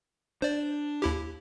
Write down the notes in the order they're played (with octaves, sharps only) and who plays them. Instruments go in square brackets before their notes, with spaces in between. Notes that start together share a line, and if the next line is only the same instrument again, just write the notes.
[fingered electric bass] D4 [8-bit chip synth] C5 D5
[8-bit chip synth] D#2 E4 G4